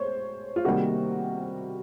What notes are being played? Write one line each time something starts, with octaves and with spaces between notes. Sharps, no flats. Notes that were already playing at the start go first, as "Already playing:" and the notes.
Already playing: C5 C#5
F4
C3 D#3 G3 A#3 F#4